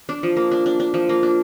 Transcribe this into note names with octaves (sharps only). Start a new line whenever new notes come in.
D4
F3
A#3
D4
D4
D4
F3
A#3
D4